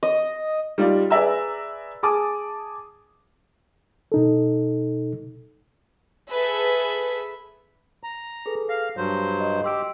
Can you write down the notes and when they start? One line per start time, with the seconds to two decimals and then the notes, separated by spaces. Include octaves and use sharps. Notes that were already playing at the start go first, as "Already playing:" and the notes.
0.03 D#5
0.78 G3 D#4 F4 D5
1.10 G#4 B4 D5 E5 A#5 E6
2.03 G#4 A5 D6 D#6
4.12 B2 D#4 A4
6.31 G#4 A4 B4 E5
8.03 A#5
8.46 G#4 A4 B4
8.69 F5 A#6
8.97 G2 F#3 C5
9.40 D#5
9.64 G4 C6 E6 D7